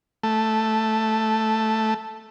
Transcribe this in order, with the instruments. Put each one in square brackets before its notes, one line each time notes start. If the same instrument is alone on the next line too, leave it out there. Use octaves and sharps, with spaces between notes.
[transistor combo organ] A3